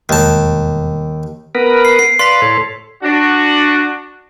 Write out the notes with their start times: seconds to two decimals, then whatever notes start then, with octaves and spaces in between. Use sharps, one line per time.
0.09 E1 D#2 G3 A5
1.55 B3 A#4 B4
1.85 C7
1.99 C7
2.19 B4 D5 F5 C6 B6
2.42 A2 A4 C#5
3.03 D4 F#4